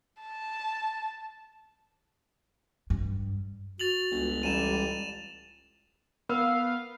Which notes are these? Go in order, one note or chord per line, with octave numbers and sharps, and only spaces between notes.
A5
G2
F#4 A6 F7 F#7
G1 C#2
A1 G3 D#7 E7
B3 A#4 B4 F5